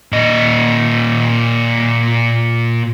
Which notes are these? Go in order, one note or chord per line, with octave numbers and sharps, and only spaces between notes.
A#2 D#5